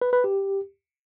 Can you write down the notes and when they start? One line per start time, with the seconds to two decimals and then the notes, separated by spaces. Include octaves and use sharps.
0.02 B4
0.13 B4
0.24 G4